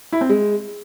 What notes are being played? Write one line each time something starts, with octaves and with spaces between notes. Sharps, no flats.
E4
C4
G#3